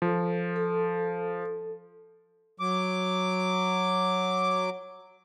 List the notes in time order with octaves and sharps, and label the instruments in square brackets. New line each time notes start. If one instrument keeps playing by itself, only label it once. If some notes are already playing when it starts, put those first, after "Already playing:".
[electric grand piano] F3 [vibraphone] A4
[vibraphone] A4
[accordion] F#3 D6